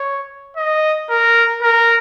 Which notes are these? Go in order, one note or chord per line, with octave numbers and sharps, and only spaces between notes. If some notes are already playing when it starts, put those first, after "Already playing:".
Already playing: C#5
D#5
A#4
A#4